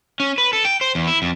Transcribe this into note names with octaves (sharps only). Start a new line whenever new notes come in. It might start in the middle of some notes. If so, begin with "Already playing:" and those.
C#4
B4
A4
G5
C5
E2
E4
F2